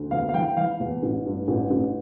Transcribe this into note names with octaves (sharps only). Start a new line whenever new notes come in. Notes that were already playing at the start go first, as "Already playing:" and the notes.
Already playing: D2
E2 F5
F5
E3 G5
E3 F5
E2
A1
G2
A1
A1